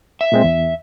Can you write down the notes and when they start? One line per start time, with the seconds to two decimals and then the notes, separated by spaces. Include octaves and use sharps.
0.21 E5
0.32 A#2 G#3 C4
0.44 E2